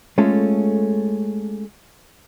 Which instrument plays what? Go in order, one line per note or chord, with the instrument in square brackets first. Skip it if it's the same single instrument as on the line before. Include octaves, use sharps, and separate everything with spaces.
[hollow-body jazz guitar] G#3 A3 C#4 F4 A4